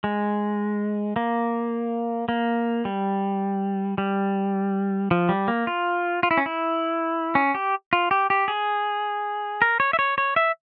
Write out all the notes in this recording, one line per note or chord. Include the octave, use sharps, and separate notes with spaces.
G#3
A#3
A#3
G3
G3
F3
G3
A#3
F4
F4
E4
C#4
E4
C#4
G4
F4
G4
G4
G#4
A#4
C#5
E5
C#5
C#5
E5